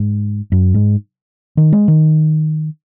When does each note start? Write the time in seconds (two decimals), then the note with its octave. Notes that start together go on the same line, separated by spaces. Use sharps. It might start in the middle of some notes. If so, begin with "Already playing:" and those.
Already playing: G#2
0.52 F#2
0.74 G#2
1.57 D#3
1.72 G#3
1.88 D#3